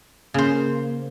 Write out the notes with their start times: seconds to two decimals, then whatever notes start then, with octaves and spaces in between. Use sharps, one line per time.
0.34 C#3 A#3 C5